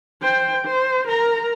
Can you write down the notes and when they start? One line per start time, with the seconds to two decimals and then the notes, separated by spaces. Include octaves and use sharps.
0.22 C5 G5
0.65 C5
1.08 A#4 A#5